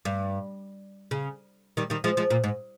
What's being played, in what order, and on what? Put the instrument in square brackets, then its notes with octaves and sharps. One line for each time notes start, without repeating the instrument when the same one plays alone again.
[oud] G2
C#3
D#3 G3
D#3 G3
F3 G#3
F3 G#3
A#2
G#2